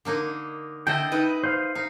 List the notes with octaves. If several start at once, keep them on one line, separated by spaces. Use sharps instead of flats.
D3 A#3 D#4
D3 E4 D#5 G5 A5
D#4 B4
C5 F5
D#4 F5